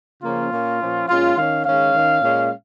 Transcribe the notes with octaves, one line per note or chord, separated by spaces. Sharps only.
C#3 F3 A#3 C#4 F4
A#2 A#3 C#4
A#2 F3 C#4
A#2 G#3 C#4 F4
D#3 C#4 F5
D#3 G#3 C#4 F5
D#3 C#4
A#2 G#3 C#4